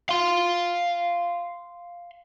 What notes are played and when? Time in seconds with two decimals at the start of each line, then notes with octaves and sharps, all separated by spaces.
0.09 F5 C6